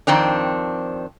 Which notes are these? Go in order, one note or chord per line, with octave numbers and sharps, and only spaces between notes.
F2 D#3 C4 D4